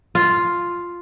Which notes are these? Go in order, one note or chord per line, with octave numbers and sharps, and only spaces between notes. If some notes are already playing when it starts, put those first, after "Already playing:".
F4